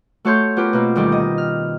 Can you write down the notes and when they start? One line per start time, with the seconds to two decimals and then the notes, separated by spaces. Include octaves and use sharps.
0.25 A3 F#4 A4 C#5 C6 G6
0.57 B3 F4 G4 A#4
0.73 B2 A#3 C4
0.96 D2 D#3 G3 G4
1.12 D#5
1.38 F6